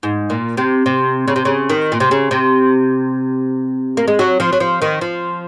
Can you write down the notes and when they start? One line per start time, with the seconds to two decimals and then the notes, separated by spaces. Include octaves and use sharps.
0.03 G#2
0.30 A#2
0.57 C3
0.86 C3
1.28 C#3
1.36 C3
1.45 C#3
1.70 D#3
1.92 A#2
2.00 C3
2.11 C#3
2.31 C3
3.97 A#3
4.08 G#3
4.19 F#3
4.40 F3
4.52 F#3
4.60 F3
4.82 D#3
5.01 F3